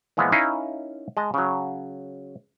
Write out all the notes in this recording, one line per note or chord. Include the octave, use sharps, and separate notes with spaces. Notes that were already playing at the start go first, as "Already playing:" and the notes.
A#2 E3 F3 G#3 B3
C#4 D#4 E4 A#4 D#5 F5
G#3 D#5 A5
C#3 F#3